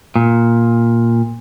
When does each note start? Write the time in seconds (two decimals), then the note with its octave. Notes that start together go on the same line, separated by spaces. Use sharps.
0.16 A#2